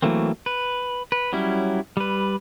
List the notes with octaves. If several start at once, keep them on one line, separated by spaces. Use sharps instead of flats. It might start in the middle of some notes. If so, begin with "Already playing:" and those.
E3 F#3 A3 A#3 C4
B4
B4
F#3 G3 C#4 E4
G3 B4